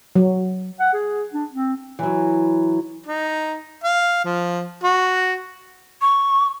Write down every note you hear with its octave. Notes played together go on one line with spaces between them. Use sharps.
F#3
F#5
G#4
D4
C4
E3 F#3
D#4
F5
F3
F#4
C#6